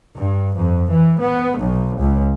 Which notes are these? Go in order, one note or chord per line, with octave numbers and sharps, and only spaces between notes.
G2
F2
E3
B3
B1
C#2